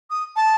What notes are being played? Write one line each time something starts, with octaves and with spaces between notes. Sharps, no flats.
D#6
A5